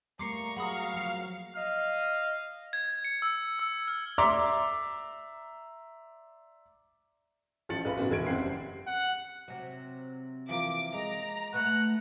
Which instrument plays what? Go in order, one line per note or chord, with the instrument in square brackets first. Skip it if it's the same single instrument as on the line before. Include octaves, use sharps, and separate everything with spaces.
[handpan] G3 A3 A#3 [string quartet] A#5 C#6 [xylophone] D6 C7 C#7
[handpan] F#3 G#4 [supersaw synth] F5 [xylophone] F#5 B5 D#6
[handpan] F3 F#3
[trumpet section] D#5 F5
[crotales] G#6
C#7
E6
E6
F6
[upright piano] D5 E5 A#5 C6 D6
A1 F3 A6 C#7 F#7
A#1 F4 B4 F#7
A1 C#3 A#3 B3 F#4
E1 A#1 G#6 D7
F#1 C#2 C4 F#5 C7
G3
[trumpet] F#5
[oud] C3 F#3
[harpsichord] E3 F3 A#3 [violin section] D6
[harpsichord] G#3 [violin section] A#5
[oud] A3 B3 [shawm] F#5